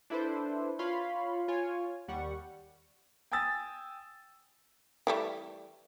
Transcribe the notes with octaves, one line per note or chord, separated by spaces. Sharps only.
D4 E4 A4 B4 C5
F4 C#5 F5 B5 C6
F4 C#5 G#5
D#2 G3 F#5 C#6
G5 G#5 D#6 E6 A6
E3 G3 A3